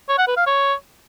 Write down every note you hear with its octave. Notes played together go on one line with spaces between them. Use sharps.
C#5
F#5
B4
F5
C#5